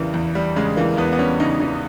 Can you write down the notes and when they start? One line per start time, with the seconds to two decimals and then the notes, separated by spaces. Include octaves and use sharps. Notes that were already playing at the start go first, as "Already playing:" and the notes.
Already playing: E2 C#3 E3 G3 A#3
0.14 E2
0.35 G3
0.56 C#3 G#3
0.76 E3 A#3
0.97 E2 B3
1.13 B3
1.19 G3 C#4
1.40 C#3 D#4
1.60 E3 D#4